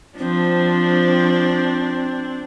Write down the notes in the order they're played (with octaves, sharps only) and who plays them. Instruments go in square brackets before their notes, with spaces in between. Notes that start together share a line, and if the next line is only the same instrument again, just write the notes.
[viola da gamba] F3 [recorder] C4 [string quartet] D4